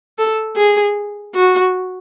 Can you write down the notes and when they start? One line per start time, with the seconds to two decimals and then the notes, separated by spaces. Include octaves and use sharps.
0.18 A4
0.56 G#4
1.34 F#4